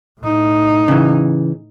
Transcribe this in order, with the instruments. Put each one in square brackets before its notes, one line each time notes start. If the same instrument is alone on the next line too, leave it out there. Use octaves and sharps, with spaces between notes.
[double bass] A2 D#4
[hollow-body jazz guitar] C#3 E3